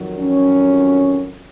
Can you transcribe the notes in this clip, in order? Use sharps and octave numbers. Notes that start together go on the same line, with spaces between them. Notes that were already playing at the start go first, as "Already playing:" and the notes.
Already playing: F2 D#3 F#3
C#4